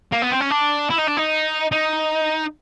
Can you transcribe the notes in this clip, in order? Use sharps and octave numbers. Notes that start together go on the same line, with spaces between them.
A#3
B3
C4
C#4
D4
E4
D#4
D4
D#4
D#4